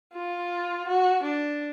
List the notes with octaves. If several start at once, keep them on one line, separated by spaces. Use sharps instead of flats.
F4
F#4
D4